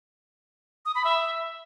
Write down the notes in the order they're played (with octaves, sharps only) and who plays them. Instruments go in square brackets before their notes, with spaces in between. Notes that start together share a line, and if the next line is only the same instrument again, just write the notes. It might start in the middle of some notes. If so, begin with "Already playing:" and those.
[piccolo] D#6
B5
E5